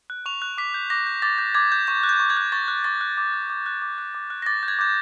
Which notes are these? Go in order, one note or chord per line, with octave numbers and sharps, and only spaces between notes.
F#6
C#6 F7
F#6
D6 B6
G6
D6 A#6
G6
D6 A6
G6
D6 G#6
G6
C#6 G6
F#6
G6
C#6
G#6
F#6
C#6 A6
F#6
C#6 A6
F#6
D6
F#6
D6
F#6
D6
F#6
D6
F#6
A#6
D6 A6
G6
G#6
D6 G6